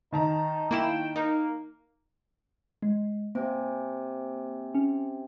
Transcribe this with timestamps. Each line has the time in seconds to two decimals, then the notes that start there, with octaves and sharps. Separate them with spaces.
0.12 D#3 D#4 A5 A#5
0.71 A#3 E4 G5 E7
1.16 A#3 D#4
2.82 G#3
3.35 C3 A#3 G#5
4.75 C#4